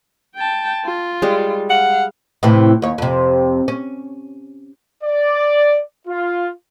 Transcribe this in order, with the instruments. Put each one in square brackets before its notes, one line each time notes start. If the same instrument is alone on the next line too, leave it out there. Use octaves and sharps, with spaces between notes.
[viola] G5 A5
F4
[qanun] G3 G#3
[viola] F5 [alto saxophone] F#5
[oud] A2 C3 E3
D#2 C#5
F2 C3
C#4
[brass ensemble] D5
F4